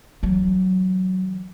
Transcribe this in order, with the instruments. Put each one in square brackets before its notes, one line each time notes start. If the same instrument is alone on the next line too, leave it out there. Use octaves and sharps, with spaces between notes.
[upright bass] E3 F#3